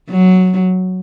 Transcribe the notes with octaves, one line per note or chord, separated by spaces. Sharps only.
F#3